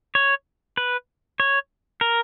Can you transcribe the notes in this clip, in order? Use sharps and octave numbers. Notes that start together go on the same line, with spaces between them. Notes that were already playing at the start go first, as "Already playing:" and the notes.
C#5
B4
C#5
A#4